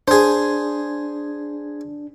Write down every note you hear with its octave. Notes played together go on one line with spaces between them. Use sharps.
D4 G#4 C5